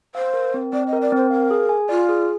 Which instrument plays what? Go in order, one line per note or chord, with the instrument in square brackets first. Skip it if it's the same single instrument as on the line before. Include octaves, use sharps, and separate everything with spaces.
[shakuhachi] C5 [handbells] F5
[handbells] A#4
C4
[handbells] C4 [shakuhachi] D5
[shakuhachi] D#5
[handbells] A#4
[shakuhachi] D5
[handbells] C4 [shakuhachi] C5
[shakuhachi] A#4 [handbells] F5
[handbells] G#4
G#5
[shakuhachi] F4 [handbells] D5
[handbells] G#4